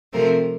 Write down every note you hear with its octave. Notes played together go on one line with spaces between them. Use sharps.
C3 F3 A3 C4 A#4